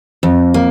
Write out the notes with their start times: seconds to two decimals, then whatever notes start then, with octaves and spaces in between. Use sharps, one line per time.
0.23 F2
0.54 A#3